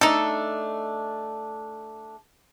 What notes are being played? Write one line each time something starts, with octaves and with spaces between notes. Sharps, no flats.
A3 D4 D#4 A4